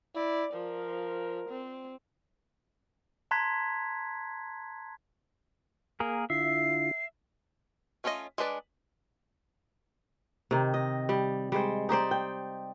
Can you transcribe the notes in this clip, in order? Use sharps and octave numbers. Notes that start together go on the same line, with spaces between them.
E4 D5
F3 A#4
C4
A5 A#5 C6 F#6 G#6 B6
A#3 G#4 A#4
D3 E4 F4 E5 C7
A3 C#4 F4 A4 D#5
G#3 D4 B4 D5
C3 D#3
D#5
G3
G3 G#3 C5
D#4 G4 C5 D5
G5